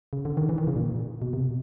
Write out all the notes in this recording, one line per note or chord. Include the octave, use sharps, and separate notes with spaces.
C#3
D3
D#3
E3
D#3
C#3
A#2
B2
C3